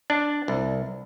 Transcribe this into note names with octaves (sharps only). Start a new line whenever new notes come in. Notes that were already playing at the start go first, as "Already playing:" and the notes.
D4
C2